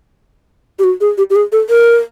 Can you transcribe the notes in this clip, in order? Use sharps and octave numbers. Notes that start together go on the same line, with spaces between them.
G4
F#4
G#4
G4
G4
G#4
A4
A#4